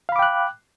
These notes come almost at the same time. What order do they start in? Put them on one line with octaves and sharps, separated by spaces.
F5 B5 D6 G5 F#6